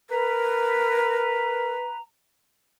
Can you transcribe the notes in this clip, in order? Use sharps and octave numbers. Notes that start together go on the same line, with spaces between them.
A#4 B4 A#5